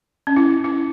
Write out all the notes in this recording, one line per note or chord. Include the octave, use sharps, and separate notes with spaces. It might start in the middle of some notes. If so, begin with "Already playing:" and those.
C#4
E4
E4